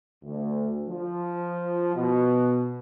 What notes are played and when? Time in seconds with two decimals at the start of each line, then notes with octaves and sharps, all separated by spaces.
0.23 D2
0.88 F3
1.95 B2